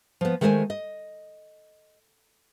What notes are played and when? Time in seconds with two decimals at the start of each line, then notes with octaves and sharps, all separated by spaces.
0.21 F3 B3
0.41 D#3 G#3 A3 C5 D5 G#5
0.70 D#5